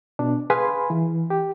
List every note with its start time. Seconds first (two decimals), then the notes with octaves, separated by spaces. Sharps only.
0.19 B2 D4
0.50 G#4 B4 F5 G#5 B5 C6
0.90 E3
1.30 G4